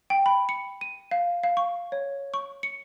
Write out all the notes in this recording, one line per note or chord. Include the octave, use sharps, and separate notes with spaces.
G5
B5
C#7
D#7
F5
F5
C#6
C#5
C#6
C#7